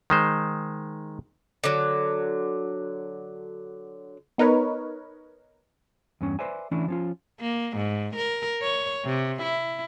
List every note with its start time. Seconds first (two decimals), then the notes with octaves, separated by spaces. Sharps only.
0.10 D#3 G#3 C5
1.64 D3 F#3
4.38 B3 D#4 A#4 B4 C#5
6.21 E2 G2 C#4
6.39 B4 C5 D5 E5 G#5
6.71 E3 A3 C#4 D4 E4
6.88 F3 C#4 F4
7.41 A#3
7.77 G#2
8.16 A#4
8.62 C#5
9.05 C3
9.42 E4